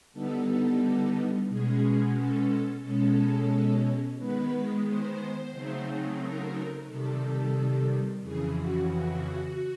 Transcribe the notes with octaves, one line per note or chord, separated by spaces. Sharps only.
D3 G3 B3 D#4 A4
B2 G#3 C#4 G#4
A4
B2 G#3 C#4 A4
D#3 G#3 B3 B4
C5
C#3 F#3 A3 C4 D#4
A#4
C3 D#3 G3 A4
F2 C#3 E3 G#4
F#4
F#4